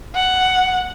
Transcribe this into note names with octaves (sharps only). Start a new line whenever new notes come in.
F#5